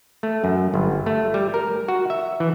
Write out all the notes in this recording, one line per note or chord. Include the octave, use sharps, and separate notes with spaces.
A3
F#2
G1
A3
G3
A#4
F#4
E5
E3